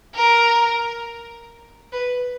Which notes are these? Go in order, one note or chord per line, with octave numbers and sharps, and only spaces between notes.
A#4
B4